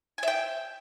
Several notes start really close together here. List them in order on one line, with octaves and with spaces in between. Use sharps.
G#5 E5 G5